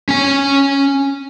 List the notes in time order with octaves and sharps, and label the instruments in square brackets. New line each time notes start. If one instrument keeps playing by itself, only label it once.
[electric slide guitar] C#4 G#5